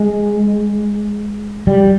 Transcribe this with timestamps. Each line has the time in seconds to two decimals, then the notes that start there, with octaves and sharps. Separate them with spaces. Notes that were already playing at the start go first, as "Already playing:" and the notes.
Already playing: G#3
1.67 G3